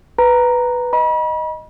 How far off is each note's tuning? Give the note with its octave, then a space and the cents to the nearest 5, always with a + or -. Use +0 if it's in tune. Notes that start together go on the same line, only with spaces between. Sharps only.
B4 +0 A#5 +0
D#5 +0 B5 -40